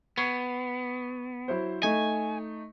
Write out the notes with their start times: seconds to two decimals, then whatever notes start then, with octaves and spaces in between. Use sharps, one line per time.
0.18 B3 C#6 G#6 C7
1.48 F#3 E4 C5
1.83 A3 D#4 G#5